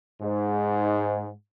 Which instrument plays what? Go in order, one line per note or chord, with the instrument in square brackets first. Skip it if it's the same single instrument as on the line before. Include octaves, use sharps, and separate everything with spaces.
[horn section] G#2